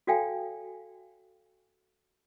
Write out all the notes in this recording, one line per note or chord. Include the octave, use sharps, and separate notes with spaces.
F#4 A4 D5 F5 G5 G#5